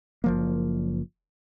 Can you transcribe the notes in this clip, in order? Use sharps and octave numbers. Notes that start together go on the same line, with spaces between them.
F#1 F3 A#3